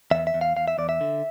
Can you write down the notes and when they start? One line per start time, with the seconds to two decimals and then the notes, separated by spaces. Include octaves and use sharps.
0.11 E2 E5
0.27 E5
0.34 E2
0.41 F5
0.56 E2 F5
0.68 E5
0.78 E2 D5
0.89 E5
1.01 D3